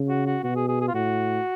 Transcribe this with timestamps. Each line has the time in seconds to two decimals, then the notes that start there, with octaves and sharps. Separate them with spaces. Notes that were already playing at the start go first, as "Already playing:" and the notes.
Already playing: C#3
0.09 F#4
0.27 F#4
0.43 B2 F#4
0.56 G#4
0.69 G#4
0.81 G#4
0.88 F4
0.94 A2 F#4